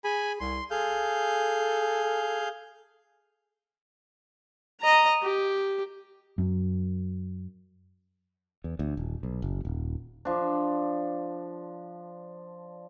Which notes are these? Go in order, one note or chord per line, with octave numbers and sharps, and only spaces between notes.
G#4 G#5 B5
C2 C6
G#4 A4 F5 G6
D#5 A#5
G4
F#2
E2
D2
D#1
B1
F#1
D#1
F3 D4